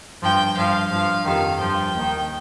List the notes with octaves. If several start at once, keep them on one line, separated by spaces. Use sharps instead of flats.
G2 F3 G5
G2 F3 F5
G2 F3
F2 C3 D#3 F5
G2 F3 G5
D#2 D#3